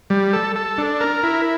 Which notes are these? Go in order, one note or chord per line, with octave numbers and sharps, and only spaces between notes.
G3
A4
A4
D4
A#4
E4